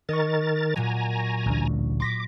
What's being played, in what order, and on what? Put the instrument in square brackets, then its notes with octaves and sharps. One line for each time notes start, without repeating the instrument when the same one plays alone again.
[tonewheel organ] D#3 A#4 A6 [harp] D#5 C#6
[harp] A#2 F#3 [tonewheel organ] G#5 A#5
[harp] C#6 A#6
[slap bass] A1 D2 D4
[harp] C6 A#6 B6 [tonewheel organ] D6